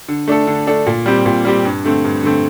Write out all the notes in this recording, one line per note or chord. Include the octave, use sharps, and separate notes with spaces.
D3
A3 D4 A4
D3
A3 D4 A4
A#2
G3 C4 G4
A#2
G3 C4 G4
G2
D3 A3 C4
G2
D3 A3 C4